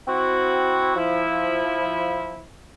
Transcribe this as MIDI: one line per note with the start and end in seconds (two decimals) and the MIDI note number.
0.08 0.95 60
0.08 0.95 64
0.08 0.95 66
0.96 2.45 53
0.96 2.45 64